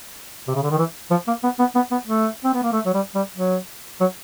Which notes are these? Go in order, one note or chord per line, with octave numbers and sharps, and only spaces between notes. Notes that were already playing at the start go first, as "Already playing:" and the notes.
C3
C#3
D3
D#3
E3
F3
A#3
B3
B3
B3
B3
A3
C4
B3
A#3
A3
F#3
G3
G3
F#3
F#3